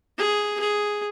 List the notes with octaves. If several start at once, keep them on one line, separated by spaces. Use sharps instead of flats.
G#4
G#4